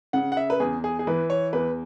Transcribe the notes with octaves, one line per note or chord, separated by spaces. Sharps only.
C#3 F#5
F#5
E5
B4
E2 G#4
G#4
G#4
E3 B4
C#5
E2 B4